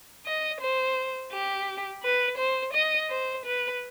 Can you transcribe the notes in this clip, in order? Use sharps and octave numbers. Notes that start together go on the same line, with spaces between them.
D#5
C5
G4
B4
C5
D#5
C5
B4